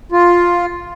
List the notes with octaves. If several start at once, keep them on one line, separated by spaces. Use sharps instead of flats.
F4